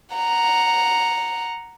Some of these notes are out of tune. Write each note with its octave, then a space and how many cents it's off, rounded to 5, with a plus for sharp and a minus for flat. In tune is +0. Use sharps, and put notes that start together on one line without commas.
F#5 +0 A#5 +0